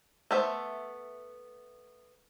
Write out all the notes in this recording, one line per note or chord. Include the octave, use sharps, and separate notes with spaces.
A3 B3 C5 E5